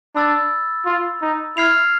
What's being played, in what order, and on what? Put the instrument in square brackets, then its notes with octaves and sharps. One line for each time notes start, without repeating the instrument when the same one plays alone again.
[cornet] D4 [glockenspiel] B5 E6 A6
[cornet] F4
D#4
[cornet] E4 [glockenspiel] F6 G#6 C7 F7